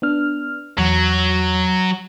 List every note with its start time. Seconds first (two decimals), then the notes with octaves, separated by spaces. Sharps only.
0.02 B3 D4 F6
0.78 E2 F#3